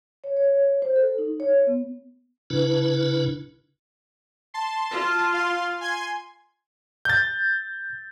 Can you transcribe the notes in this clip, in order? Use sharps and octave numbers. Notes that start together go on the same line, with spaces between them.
C#5
C#5
C5
A4
D#4
C#5
B3
C#3 D4 E4 B4
A5 C6
F4
F5 C6
G#5 C6 G#6
G6 A6